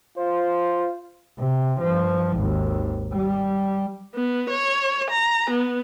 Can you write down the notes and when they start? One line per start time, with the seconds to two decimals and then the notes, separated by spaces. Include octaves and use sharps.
0.18 F4 C5
1.39 C3
1.80 G2 F3
2.36 G#1 D#2
3.12 G3
4.15 B3
4.50 C#5
5.11 A#5
5.50 B3